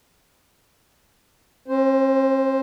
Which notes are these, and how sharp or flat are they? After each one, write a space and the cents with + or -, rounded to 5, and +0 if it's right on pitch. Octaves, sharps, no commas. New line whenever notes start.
C4 +45 C5 +0